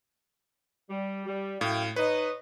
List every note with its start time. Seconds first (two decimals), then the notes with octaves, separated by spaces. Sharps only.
0.90 G3
1.26 G3
1.61 F#2 A2 F5 G5
1.96 D#4 B4 C#5 D#5